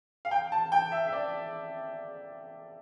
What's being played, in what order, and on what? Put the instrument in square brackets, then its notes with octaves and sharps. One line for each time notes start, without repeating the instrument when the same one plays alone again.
[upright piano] F5
G5
A5
G5
E5
E5
D5